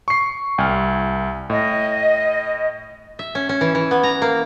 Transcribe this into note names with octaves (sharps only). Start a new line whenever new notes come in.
C#6 C7
C2 G5 G#5 F6
A2 D#5
E5
C#4
C#4
E3
E3
B3
A#5
A#3